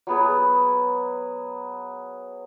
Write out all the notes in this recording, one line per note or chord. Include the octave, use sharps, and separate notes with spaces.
F#3 B3 G#4